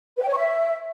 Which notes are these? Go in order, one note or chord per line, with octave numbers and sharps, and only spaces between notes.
B4
G5
C#5
C#6
E5